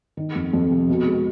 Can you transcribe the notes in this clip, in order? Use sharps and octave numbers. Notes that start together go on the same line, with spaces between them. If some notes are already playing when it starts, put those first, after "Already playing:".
D#3
F2
F2
C3
B2
G#3